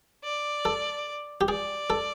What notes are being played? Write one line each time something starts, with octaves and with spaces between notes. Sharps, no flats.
D5
A4
G4
G#4 D5
A4